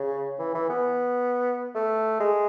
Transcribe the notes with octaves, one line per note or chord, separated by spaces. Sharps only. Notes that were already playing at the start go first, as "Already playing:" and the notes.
Already playing: C#3
E3
E3
B3
A3
G#3